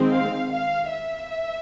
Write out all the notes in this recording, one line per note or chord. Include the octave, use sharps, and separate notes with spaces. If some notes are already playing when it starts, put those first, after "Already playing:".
Already playing: D#3 G#3 C4
F5
F5
E5